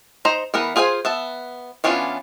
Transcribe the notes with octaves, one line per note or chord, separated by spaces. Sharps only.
D#4 C5 A#5
E3 B3 A#4 B4
F4 G#4 C5 F5 G#5
B3 E5 A5
E3 B3 C#4 D4 F4